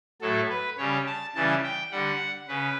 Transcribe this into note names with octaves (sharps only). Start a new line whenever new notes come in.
A2 F#3 A3 A4
B4
C#3 G3 C#5
A5
C#3 E3 G3 A5
G5
D3 G3 F#5
C#3 B4